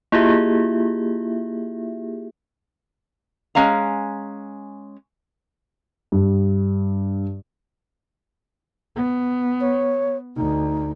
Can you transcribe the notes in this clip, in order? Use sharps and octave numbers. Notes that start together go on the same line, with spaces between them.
A#3 E4 F4 G4 G#4 E5
G#3 C#4 F5 A#5
G2
B3
C#5
D2 D#4